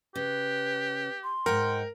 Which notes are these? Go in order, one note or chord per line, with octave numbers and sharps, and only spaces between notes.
C#3 G4 B4
C6
G#2 G#3 A#4 F#5 G5